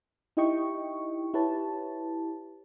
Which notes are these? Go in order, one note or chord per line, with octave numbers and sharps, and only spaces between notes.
D#4 E4 G4 D#5 G5 C#6
E4 G4 B4 C#5 A5